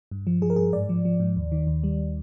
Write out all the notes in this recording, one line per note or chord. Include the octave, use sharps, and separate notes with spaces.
G2
F3
F3 G#4
A#4
G2 G#4
G#2 D5
F3
F3
G#2
D#2
D#3
D#2
G3